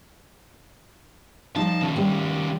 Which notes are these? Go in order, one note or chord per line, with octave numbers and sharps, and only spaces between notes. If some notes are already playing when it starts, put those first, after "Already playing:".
F3 G3 D#4 A5
D#3 C#4
G3 G4